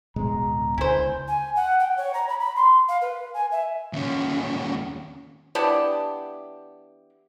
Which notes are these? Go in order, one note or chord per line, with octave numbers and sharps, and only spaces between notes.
D1 B2 G#3 A#5
C#2 E4 C5 G#5
G#5
F#5
G5
C#5
A#5
B5
B5
C6
F5
B4
G#5
E5
D#2 C#4
E3 B3 D4 G4